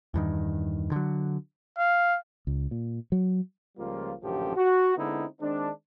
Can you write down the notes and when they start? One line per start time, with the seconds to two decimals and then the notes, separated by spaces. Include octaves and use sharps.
0.14 E2 G2 D#3
0.92 D3 F#3
1.78 F5
2.47 C#2
2.71 A#2
3.12 F#3
3.78 C#2 F3 G3 A#3 F4
4.23 A1 F#2 A#2 D3 F3 G4
4.57 F#4
4.97 D3 G#3 B3 C4 D#4 E4
5.41 D#3 G#3 C4 D4